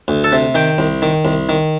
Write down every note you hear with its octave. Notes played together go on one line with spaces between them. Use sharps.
D2
A4
C3
D#3 G5
C2
D#3
C2
D#3